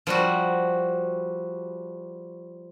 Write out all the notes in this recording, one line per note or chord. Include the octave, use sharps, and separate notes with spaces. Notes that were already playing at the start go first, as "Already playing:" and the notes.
F3 G3 F#4